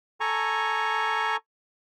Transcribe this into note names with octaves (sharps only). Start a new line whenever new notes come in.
A4 G#5 A#5 C#6